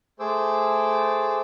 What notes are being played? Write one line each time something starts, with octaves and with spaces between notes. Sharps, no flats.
A3 G#4 C5 D6 E6